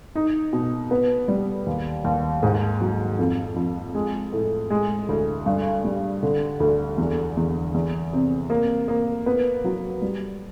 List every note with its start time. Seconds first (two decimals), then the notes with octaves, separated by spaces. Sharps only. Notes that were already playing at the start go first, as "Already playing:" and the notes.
0.15 D#4
0.53 B2
0.91 B3
1.28 G3
1.67 D#2
2.04 D#2
2.43 G#2
2.81 F#3
3.19 F2
3.56 F2
3.95 G#3
4.33 A2
4.70 G#3
5.09 D2
5.46 G2
5.84 G3
6.23 D3
6.60 D2
6.98 E2
7.37 E2
7.74 E2
8.13 C3
8.50 A#3
8.88 A#3
9.26 B3
9.64 F#3
10.02 G3